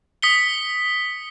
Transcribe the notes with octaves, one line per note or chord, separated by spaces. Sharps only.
D#6 B6 C#7 G7